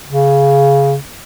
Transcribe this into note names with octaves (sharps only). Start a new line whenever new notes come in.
C#3